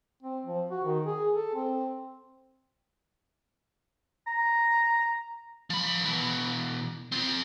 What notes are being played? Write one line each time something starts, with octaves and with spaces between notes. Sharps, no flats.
C4
F3
F#4
D#3
G#4
A4
C4
A#5
F3 B5
B2 E3
C4 F4